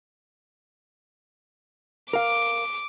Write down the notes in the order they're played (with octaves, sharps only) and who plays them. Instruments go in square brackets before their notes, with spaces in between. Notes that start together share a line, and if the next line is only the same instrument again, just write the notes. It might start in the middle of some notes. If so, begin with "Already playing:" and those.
[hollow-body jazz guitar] A#4 F5 [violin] D6